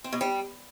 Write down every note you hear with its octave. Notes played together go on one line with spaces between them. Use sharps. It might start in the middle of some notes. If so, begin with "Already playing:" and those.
C4
B2
G3